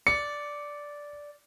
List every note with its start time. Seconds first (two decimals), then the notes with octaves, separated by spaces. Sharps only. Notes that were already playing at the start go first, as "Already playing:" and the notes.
0.07 D5 C#7